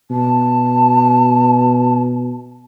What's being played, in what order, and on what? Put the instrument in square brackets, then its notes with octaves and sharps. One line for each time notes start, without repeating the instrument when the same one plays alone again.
[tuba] B2 [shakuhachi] A5